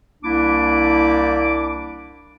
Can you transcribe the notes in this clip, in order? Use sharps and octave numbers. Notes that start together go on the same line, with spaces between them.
C2 A#3 D4 E4 D6